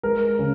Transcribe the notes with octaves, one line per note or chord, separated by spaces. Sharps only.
G#3 A#4
C#3